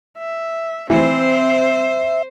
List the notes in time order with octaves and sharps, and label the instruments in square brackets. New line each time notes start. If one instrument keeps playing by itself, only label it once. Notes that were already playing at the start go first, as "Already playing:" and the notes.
[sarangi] E5
[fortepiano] E3 [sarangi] C4 [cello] C5 [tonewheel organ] E5